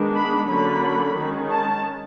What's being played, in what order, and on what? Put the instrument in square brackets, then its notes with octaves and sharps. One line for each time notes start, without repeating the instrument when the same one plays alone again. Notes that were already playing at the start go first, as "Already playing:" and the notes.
Already playing: [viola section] D#3 G#3 B3 D4
B5
D3 F#3 A#3 C#4 B5
D#3 G#3 C#4
A5